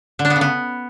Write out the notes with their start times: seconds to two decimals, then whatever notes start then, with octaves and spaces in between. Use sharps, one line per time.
0.19 D3
0.25 D4
0.30 B3
0.36 C#3
0.41 B3